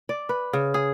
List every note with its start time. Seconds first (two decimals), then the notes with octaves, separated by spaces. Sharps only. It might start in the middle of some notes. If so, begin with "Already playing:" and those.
0.09 D5
0.29 B4
0.53 C#3
0.74 G#4